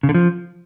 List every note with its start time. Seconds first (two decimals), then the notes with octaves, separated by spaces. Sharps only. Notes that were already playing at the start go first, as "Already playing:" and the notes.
0.03 C#3
0.09 D3
0.15 F3